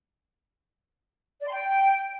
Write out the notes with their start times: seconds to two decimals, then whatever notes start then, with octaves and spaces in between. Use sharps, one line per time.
1.41 D5
1.47 C6
1.53 G5